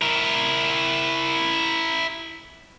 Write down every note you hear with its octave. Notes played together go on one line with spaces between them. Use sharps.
E4 A#4